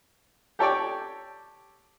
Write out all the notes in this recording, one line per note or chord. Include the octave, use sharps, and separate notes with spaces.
G4 A4 C#5 D5 G5